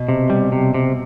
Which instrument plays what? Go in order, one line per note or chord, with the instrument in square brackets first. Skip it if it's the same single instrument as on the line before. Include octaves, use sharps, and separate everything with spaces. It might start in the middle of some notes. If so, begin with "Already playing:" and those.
Already playing: [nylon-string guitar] B2
[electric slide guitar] C3
G3
C3
C3